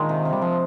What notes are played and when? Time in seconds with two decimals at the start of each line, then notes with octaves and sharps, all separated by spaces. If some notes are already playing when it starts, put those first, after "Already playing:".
Already playing: A#2 D#3 G#3 D4
0.09 C3
0.25 C3
0.33 G3
0.42 F3 C4